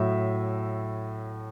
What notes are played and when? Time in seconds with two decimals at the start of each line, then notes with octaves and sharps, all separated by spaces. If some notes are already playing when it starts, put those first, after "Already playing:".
Already playing: A2 F#3 E5